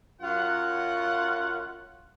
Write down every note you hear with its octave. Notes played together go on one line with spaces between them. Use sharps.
F#2 F4 F#5